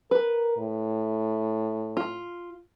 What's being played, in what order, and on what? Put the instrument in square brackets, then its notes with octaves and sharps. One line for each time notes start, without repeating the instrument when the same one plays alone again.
[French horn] A#4 [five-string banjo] B4
[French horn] A2
[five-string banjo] F4